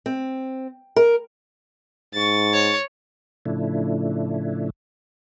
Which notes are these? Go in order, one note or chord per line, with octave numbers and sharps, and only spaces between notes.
C4
A#4
G#2 C#6 A6
C#5
A2 C#3 F3 A3 D4 E4